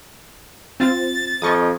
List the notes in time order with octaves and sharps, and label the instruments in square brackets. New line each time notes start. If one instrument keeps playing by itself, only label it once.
[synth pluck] C4 F4 [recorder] A6
[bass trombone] F2 [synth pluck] D#5 C#6 D#6